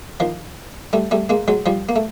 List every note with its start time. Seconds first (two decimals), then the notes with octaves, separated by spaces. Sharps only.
0.20 D#3 F3
0.93 G3 A3
1.11 G3 A3
1.29 G#3 A#3
1.48 F#3 G#3
1.66 F3 G3
1.89 A#3
1.96 A3